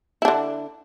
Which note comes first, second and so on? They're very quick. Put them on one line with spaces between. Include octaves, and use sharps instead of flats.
E4 D4 D3